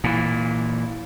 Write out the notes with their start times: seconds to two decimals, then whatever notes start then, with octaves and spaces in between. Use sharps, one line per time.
0.04 A#2 E3